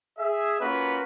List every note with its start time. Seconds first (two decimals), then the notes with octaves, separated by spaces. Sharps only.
0.18 G#4 E5
0.60 A#3 C#4 F4 F#4 B4